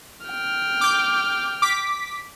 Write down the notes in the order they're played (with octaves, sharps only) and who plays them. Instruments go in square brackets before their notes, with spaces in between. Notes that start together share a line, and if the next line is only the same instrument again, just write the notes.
[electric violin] G5 F6
[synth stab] D6 G6
D6 B6